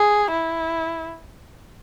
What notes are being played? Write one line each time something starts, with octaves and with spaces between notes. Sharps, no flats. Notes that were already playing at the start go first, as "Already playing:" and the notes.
Already playing: G#4
E4